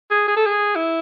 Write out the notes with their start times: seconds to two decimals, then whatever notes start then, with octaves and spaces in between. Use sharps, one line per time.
0.11 G#4
0.28 G#4
0.36 A4
0.46 G#4
0.76 E4